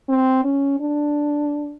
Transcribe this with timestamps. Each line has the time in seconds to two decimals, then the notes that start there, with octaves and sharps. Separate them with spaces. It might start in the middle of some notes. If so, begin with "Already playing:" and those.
0.09 C4
0.44 C#4
0.80 D4